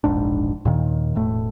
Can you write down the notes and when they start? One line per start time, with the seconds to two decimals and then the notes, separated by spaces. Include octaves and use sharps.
0.04 E1 A#1 G#2 D4
0.65 D#2 A#2 D#3
1.15 E1 A2 A3